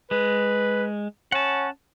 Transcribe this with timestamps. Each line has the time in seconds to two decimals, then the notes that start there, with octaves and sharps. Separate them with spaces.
0.11 G#3 B4
1.32 C#4 F#5 A5